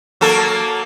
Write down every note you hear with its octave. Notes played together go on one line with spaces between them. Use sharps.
F#3 A#3 A4